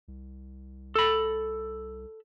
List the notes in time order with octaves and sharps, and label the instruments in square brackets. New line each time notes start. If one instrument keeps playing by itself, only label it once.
[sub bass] C2
[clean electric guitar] A4 B5